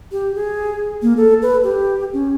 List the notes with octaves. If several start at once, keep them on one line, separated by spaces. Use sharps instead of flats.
G4
G#4
A#3
A4
B4
G4
C#4